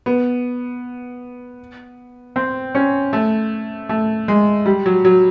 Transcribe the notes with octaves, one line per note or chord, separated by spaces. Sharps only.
B3
C4
C#4
A3
A3
G#3
G3
F#3
F#3